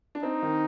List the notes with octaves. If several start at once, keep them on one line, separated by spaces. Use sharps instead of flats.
D4
C4 D#4
D#3